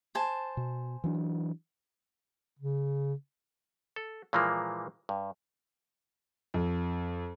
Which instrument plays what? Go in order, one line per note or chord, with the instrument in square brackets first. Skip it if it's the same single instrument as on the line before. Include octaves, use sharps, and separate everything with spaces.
[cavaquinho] C5 G#5 A5
[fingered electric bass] B2
E3 F#3 D4
[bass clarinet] C#3
[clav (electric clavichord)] A4
A#2 E3 F3 G#3 A#3
G2
[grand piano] F2